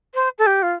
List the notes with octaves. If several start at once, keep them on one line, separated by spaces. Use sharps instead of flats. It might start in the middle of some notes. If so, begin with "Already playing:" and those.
C5
A4
G4
F4